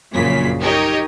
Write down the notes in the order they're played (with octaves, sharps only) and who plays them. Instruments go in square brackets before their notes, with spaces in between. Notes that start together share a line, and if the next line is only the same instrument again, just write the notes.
[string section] A#1 F#2 A#2 C#3 B6
D#4 G4 A#4 C#5 D#5